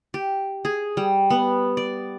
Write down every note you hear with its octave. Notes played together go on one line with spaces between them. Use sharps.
G4
G#4
G3
B3
D5